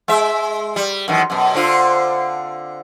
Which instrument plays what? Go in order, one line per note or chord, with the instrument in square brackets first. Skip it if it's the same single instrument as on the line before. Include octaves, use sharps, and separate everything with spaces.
[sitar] G#3 E5
G3
F#2 D#3 E3
F#2 B2
D3 C4 F4